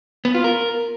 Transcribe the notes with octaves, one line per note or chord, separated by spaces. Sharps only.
B3
F4
A#4